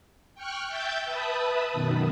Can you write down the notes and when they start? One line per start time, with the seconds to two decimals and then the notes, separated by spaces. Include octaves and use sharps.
0.35 G5 C#6 F6 F#6
0.68 E5 G5 G6 A6
1.05 B4 E5 A5 B5 D#6
1.73 F#2 B2 D#3